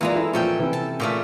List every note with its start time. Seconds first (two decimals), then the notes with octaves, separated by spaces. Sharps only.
0.01 E3 G#3 A#3 F4 D5 A#5
0.16 E4 A4
0.33 A#2 F3 C#4 A4 G5
0.59 C3 E3
0.73 A5
1.00 A#2 C#3 A3